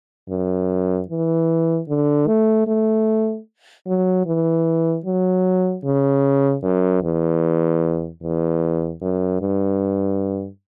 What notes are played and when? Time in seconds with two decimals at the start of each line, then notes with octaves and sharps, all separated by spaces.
0.29 F#2
1.08 E3
1.88 D3
2.27 A3
2.67 A3
3.86 F#3
4.26 E3
5.06 F#3
5.84 C#3
6.64 F#2
7.03 E2
8.23 E2
9.02 F#2
9.41 G2